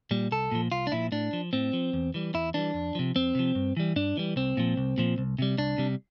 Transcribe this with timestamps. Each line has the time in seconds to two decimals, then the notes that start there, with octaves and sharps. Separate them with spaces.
0.11 A#2 G3
0.31 C2 A4
0.51 A#2 F3
0.72 C2 F4
0.87 D4
0.92 A#2 F3 E4
1.12 A2 D4
1.33 F3
1.53 A2 C4
1.73 F3
1.93 E2
2.14 E3 G3
2.34 E2 E4
2.54 E3 G3 D4
2.74 F2
2.95 C3 F3
3.15 F2 C4
3.35 C3 F3
3.55 G2
3.77 E3 G3
3.96 G2 D4
4.17 E3 G3
4.36 C2 C4
4.57 A#2 F3
4.77 C2
4.98 A#2 F3
5.18 C2
5.39 C3 G3
5.58 C2 D4
5.78 C3 G3